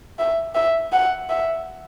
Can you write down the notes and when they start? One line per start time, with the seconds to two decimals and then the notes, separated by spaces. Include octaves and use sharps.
0.19 E5
0.55 E5
0.93 F#5
1.30 E5